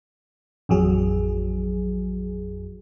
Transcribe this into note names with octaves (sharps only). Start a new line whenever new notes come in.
A1 F2 F#3 G#4